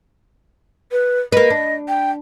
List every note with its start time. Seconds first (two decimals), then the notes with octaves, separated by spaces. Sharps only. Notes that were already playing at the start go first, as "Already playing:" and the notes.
0.92 B4
1.32 A#3 B4 D#5
1.50 D4
1.88 G5